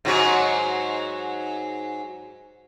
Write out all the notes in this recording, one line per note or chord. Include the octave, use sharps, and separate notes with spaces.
G#2 F#3 F#4